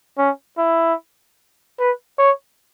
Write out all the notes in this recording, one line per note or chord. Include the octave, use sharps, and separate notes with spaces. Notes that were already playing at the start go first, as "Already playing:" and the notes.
C#4
E4
B4
C#5